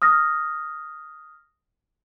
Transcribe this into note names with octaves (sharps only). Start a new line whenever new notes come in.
D#6 F6 A#6